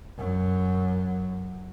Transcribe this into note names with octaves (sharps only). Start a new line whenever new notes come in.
F#2 F#3